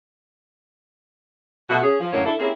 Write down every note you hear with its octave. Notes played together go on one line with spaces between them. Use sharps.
B2 A3 F#4
C#4 G#4
F3
F#2 A2 D3 A#3 C#5
D4 E4 A4
A#3 C4 C#4 E4 G4 G#4